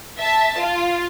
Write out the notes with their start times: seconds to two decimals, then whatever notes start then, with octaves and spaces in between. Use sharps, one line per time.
0.18 E5 A5
0.59 F4